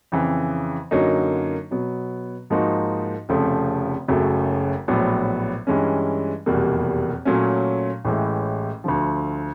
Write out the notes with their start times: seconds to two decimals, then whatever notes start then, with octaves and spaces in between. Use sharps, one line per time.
0.12 F2 C#3 E3
0.91 F#2 D3 F#3 A#3 D#4
1.71 B2 F#3 B3
2.50 G#2 F3 A#3 D#4 F#4
3.29 F1 F2 C#3 F3 A3
4.08 F#1 F#2 C#3 F#3 A3
4.88 A#1 A2 F#3 B3
5.67 G2 E3 G#3 C#4
6.46 F1 E2 B2 G3 A#3
7.25 A#2 F#3 A3 C#4
8.05 A1 A2 E3 G#3
8.84 D2 D3 F3